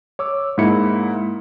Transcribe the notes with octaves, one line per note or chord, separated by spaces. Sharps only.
C#5 D6 E6
G#2 A#3 D#4 E4 C#7